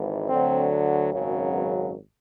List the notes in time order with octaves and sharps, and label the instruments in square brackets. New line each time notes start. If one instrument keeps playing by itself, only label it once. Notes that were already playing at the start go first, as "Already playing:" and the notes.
Already playing: [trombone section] G#1 G#2 E3
D2 D3 F#3 C4
G#1 F#2 C#3 F#3
B3